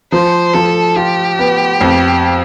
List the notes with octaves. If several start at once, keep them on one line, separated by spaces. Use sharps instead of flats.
F3 C5
F3 A4
F4 G4
B3
F2